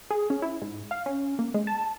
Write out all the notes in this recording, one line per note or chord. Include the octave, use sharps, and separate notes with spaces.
G#4
C#4
E4
G#2
F5
C#4
A#3
G#3
A5